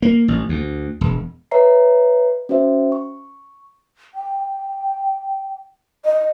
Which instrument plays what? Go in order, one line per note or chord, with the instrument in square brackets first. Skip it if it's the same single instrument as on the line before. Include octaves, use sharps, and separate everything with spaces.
[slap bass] A#3
A1
D2
E1
[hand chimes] B4 C#5 D#5 E5 A#5 C7
C#4 F#4 C5 E5
C#6
[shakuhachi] G5
D#5